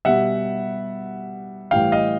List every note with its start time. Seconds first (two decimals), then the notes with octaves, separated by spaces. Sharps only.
0.05 B2 G3 E5 F#5
1.71 A2 E3 G3 F5 G5
1.92 D#5 F5